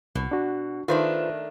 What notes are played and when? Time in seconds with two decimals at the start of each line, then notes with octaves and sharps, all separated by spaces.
0.15 C2 B2
0.31 D4 F#4
0.88 D#3 A3 D4 F4 B4 C5